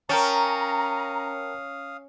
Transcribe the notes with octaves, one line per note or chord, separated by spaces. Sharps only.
C#4 A#4 F5 G5 A5 A#5 D#6